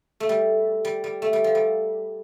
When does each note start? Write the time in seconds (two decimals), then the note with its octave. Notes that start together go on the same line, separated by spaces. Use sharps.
0.20 A3
0.29 G3
0.85 G3
1.04 G3
1.22 A3
1.33 G3
1.44 F3
1.55 G3